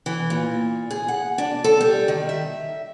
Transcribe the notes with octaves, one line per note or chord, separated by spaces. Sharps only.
E3
A#2
G#4
F#5
D4
A4
G3
D#3
E5